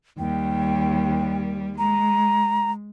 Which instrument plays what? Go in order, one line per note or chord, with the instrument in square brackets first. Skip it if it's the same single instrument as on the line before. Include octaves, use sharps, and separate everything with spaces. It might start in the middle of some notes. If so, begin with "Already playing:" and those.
[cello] D#2 G3 [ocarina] G5
[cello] G#3 [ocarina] A#5